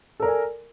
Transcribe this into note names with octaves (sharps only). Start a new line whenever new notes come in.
A4 A#4 D5 G#5